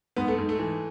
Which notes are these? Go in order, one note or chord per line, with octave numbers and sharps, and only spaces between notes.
G#2 B3
A3
G#2
A3
E3